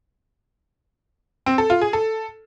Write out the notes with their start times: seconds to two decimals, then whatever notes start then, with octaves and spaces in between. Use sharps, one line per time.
1.46 C4
1.58 A4
1.70 F4
1.82 G#4
1.93 A4